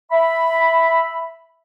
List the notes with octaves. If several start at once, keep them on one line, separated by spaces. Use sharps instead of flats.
E5 B5